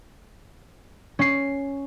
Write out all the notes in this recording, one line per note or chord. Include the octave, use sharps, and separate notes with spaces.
C#4 C7